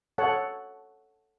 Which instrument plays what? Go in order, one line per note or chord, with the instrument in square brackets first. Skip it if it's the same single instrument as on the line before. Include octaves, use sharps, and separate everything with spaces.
[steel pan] A4 C#5 F#5 A5